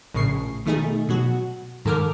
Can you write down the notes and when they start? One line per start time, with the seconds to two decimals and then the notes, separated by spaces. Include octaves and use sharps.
0.14 A#1 A2 C#3 C#6 C7
0.66 B2 D#3 A3 D#4 G#4
1.09 B2 F#3 F#4
1.85 G#2 D#3 A4 A#4 D6 F6